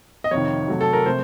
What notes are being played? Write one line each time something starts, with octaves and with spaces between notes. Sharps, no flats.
D#5
F2 C3 D#3 C#5
C3 F#3 A3
A4
A#4
C3 F3 A3 C5